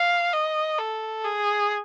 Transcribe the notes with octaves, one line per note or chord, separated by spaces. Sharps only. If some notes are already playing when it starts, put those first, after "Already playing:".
Already playing: F5
D#5
A4
G#4